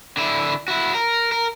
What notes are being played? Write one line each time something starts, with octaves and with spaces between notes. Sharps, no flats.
D3 E4
E4 F#4
A#4
A#4